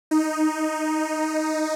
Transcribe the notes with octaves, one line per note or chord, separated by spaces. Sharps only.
D#4